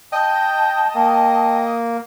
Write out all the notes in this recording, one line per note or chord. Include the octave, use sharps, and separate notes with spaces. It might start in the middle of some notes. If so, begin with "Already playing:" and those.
D#5 G5 A5
A#3 G5